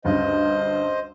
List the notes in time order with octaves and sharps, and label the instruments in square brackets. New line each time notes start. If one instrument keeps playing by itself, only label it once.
[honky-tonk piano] D2 G2 C#3 [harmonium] C5 D#5